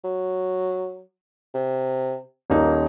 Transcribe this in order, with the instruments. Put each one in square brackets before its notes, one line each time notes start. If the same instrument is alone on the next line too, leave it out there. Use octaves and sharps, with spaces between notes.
[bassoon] F#3
C3
[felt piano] D#1 D#4 [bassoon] A#3